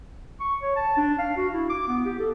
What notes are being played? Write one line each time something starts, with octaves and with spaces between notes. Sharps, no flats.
C#6
C#5
A5
D4
F5
F#4
E4
D6
B3
G4
A4